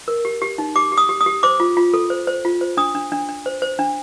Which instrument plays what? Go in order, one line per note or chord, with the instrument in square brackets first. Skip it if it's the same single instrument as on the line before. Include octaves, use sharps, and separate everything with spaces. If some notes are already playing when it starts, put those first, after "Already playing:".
[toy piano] A#4
G4
G4
D#4
G4 D6
G4
D#6
G4
D#6
G4
C5 D6
F4
F4
A4
C5
C5
F4
C5
D4 D#6
D4
D4
D4
C5
C5
D4